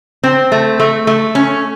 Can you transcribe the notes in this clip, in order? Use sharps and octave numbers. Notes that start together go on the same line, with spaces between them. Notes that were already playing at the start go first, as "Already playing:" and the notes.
C4
A3
A3
A3
C#4